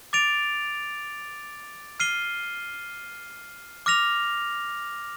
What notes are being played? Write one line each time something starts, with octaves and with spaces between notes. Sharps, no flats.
D6 A6 D7 F7
F6 C7 D#7 G7
D6 F6 A#6 F7